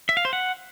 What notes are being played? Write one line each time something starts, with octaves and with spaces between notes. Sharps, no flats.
E5
F5
C5
F#5